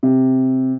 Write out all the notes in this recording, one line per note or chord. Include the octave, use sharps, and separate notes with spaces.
C3